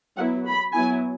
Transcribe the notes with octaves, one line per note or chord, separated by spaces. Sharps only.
F#3 B3 E4 F#5
B5
F#3 B3 E4 G#5